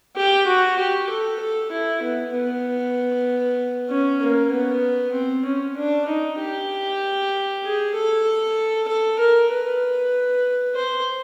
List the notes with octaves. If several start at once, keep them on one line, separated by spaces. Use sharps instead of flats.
G4
F#4
G4
A4
A4
E4
B3
B3
C#4
A#3
B3
C4
C#4
D4
D#4
G4
G#4
A4
A4
A#4
B4
C5